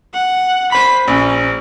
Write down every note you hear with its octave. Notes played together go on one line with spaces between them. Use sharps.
F#5
C5 B5 B6
A#1 C#4